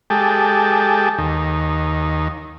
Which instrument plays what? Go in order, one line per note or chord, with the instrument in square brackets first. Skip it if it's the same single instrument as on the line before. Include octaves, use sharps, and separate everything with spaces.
[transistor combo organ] G#3 G4 A4
D#2